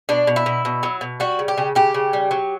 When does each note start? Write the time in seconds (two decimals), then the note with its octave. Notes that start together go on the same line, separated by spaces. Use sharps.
0.09 B2 D4
0.27 B2
0.36 E4
0.46 B2
0.65 B2
0.83 F#3
1.01 B2
1.20 G3 F#4
1.39 C#3
1.48 G4
1.58 C#3
1.75 C#3 G4
1.94 C#3
2.13 G3
2.31 F#3